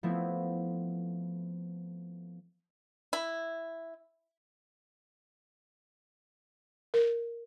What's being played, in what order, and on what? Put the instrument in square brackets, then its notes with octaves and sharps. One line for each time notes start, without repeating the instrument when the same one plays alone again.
[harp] F3 A3 B3 C4 E4
[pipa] E4
[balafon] A#4